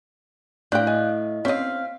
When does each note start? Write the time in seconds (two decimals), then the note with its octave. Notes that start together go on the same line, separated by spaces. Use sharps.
0.72 A2 D4 F5 G5 F#6 G6
0.87 D#5 G#5
1.45 C4 C#4 D#5 F5 B6